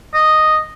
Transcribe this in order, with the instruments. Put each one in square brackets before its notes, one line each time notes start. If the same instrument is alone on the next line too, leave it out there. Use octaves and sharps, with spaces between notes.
[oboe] D#5